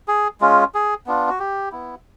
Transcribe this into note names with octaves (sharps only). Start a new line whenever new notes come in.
G#4
G#3 C#4 F4
G#4
B3 D4 F4
F#4
G4
B3 E4